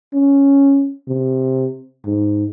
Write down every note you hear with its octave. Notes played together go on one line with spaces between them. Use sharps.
C#4
C3
G#2